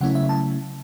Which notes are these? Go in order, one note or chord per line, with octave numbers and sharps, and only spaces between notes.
C#3 F#3 A3 C#4 E4 F#5
E5
A5